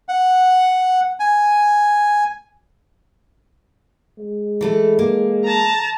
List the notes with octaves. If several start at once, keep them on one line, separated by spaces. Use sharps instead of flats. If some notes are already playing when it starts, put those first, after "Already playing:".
F#5
G#5
G#3
E3 A3 A4
A#3
A5 A#5